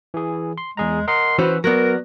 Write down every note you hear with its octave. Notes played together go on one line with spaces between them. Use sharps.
E3 G#4
C6
E2 G#3 G#4 A#5
A#4 D#5 F#5 C6
E3 C#4 F#4 B4 C5 E6
F#3 B3 A#4 D5 F#6 A#6